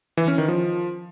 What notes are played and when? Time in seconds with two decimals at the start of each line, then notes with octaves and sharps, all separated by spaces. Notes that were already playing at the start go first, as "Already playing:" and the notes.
0.17 E3
0.28 C#4
0.38 D#3
0.48 F3